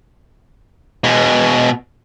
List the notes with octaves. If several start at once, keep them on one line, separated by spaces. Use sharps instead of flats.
B2 G#3